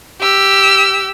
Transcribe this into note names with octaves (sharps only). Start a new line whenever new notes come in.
G4 E6